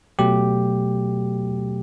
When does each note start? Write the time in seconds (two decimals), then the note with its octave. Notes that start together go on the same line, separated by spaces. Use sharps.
0.19 B2 F#3 A3 G4